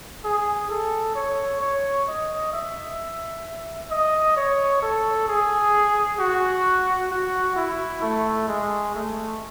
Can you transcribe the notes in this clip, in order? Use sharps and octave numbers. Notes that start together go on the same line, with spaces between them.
G#4
A4
C#5
C#5
D#5
E5
D#5
C#5
A4
G#4
F#4
F#4
E4
A3
G#3
A3